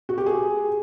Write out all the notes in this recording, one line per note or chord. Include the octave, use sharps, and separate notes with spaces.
F#4
G4
G#4